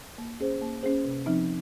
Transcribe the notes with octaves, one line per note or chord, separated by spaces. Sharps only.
A#3
C#4 G#4 C5
A#3
C#4 G#4 C5
C3
F3 C4 D#4